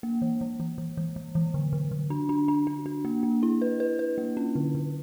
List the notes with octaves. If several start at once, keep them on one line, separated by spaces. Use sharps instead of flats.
A#3
E3
E3
E3
E3
E3
E3
E3
D3
D3
D3
D4
D4
D4
D4
D4
A#3
A#3
E4
B4
B4
B4
A#3
C#4
D3
D3